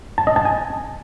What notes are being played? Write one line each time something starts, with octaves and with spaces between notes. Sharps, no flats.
A5
D#5
A5
G#5